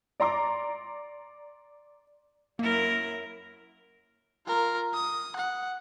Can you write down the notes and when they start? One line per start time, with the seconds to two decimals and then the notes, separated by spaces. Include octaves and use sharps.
0.20 D5 A#5 C6 D6
2.59 F#2 A#3 E4 A#4
4.47 F4 A#4
4.94 D#6
5.37 F#5